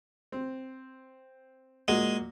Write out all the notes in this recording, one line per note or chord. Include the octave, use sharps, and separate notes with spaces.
C4
A#2 G#3 A#3 F#4